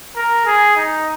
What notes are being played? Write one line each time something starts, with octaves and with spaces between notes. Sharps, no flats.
A#4
G#4
D#4